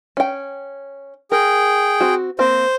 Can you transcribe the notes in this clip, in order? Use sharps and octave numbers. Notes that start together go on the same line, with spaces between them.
C#4 G5
G#4 A#4 G5
C4 F#4
A#3 C4 C5